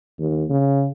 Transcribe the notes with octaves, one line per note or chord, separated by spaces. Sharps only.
D#2
C#3